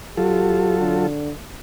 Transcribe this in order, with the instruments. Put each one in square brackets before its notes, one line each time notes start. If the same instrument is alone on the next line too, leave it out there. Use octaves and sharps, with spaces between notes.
[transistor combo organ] F#3 F4 A4 [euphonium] G4
[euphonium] D3